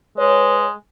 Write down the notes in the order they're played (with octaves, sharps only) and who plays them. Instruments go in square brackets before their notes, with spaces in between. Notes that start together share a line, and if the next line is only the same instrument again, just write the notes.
[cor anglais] G#3 [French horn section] B4 C#5